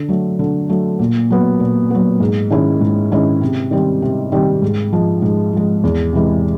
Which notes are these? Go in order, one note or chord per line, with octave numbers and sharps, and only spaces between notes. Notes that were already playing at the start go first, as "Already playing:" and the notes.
Already playing: D3
F#3 A3
D3
F#3 A3
A#2
F#3 B3
A#2
F#3 B3
G#2
D#3 G#3 C#4 E4
G#2
D#3 G#3 C#4 E4
C3
D#3 G3 C4
C3
D#3 G3 C4
G#2
F3 G#3
G#2
F3 G#3
E2
C3 E3 G#3